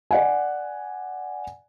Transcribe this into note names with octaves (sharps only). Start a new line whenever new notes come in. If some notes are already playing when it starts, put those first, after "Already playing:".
D5 F#5 G#5